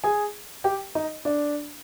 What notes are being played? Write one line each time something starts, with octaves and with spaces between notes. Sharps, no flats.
G#4 G#5
G4 G5
D#4 D#5
D4 D5